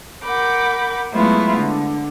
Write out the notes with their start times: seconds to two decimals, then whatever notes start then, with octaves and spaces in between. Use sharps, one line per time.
0.23 A#4 F#5 B5 D6 G6
1.12 F#3 G#3 A3 B3 E4 F4
1.55 D3